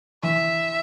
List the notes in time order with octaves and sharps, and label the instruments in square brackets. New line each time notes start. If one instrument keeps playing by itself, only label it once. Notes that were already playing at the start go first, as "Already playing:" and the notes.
[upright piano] E3 [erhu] E5